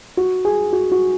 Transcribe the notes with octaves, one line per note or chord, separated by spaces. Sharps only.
F#4
G#4
F#4
F#4